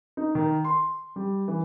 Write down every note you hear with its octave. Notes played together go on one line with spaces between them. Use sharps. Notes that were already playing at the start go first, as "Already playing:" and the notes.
D#4
D#3
C6
G3
E3